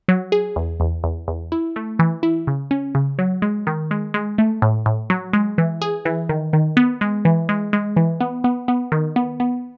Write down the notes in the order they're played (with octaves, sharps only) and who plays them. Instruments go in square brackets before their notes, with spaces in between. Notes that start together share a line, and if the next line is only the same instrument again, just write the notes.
[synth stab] F#3
G#4
E2
E2
E2
E2
E4
A3
E3
E4
C#3
C#4
C#3
F#3
G#3
D#3
G#3
G#3
A3
A2
A2
F#3
G#3
E3
G#4
E3
D#3
D#3
B3
G#3
E3
G#3
G#3
E3
B3
B3
B3
D#3
B3
B3